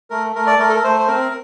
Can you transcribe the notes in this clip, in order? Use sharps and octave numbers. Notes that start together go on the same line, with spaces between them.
A3 A#4
A3 A#4
D5
A3 A#4
A4
A#4
A3 C5
C5
C4 A#4